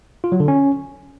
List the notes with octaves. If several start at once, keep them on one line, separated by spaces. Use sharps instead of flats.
F4
F#3
D3
C#4